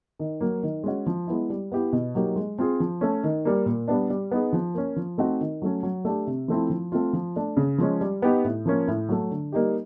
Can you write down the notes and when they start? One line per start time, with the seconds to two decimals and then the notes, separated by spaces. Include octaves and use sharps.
0.19 D#3
0.40 F#3 A#3
0.63 D#3
0.84 G#3 C#4 F#4
1.06 F3
1.27 G#3 B3 E4
1.50 G3
1.72 B3 E4 G4
1.93 B2
2.15 F#3 A#3 D#4 G4
2.36 G#3
2.58 C4 F4 G#4
2.80 F3
3.01 A3 C#4
3.24 D#3
3.45 G3 A#3
3.66 A#2
3.88 G3 B3 D4
4.10 G3
4.31 B3 D#4 G#4
4.53 F3
4.74 A#3 C#4
4.96 F3
5.18 A3 C4 D#4 F#4
5.41 D#3
5.62 F#3 A3 C#4
5.83 F#3
6.05 A3 D4 G4
6.27 C3
6.48 F3 A3 C4 E4
6.70 F3
6.92 A3 C4 F4
7.13 F3
7.36 A3 D4
7.57 C#3
7.78 F3 G#3 C#4
8.01 G3
8.22 B3 D#4 G4
8.44 A2
8.66 F3 A#3 C#4
8.88 A2
9.09 F#3 A3
9.31 D3
9.52 G3 A#3 D#4 G4